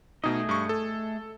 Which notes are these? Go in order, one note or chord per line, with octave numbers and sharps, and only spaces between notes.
B2 A3 D#4 G#4 D#5
G2 C#6
A4